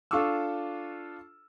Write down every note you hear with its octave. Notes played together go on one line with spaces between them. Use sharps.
D4 F4 A4 C#6 D6 E6